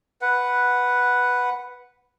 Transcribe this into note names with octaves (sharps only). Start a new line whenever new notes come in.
B4 F#5